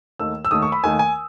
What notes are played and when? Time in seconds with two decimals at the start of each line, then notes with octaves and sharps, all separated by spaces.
0.20 D#2 D#3 A3 E6
0.45 E6
0.51 D#2 D#3 A3 D#6
0.62 C#6
0.72 B5
0.83 D#2 D#3 A3 G#5
0.99 G#5